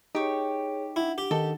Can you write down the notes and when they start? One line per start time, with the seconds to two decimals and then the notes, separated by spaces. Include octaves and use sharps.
0.15 D#4 G4 G#4 C#5 C#6
0.96 D4 E4 F#5
1.18 G4
1.31 D#3 D#4 A4